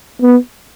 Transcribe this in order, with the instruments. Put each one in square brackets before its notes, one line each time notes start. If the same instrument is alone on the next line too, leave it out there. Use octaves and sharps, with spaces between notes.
[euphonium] B3